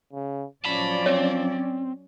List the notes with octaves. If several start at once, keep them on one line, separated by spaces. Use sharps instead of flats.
C#3
F3 F#3 C#4 D5 A5 B5
C4 C#5